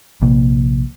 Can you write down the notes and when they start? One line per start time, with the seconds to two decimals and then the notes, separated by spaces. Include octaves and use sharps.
0.21 A#1 C3 A#3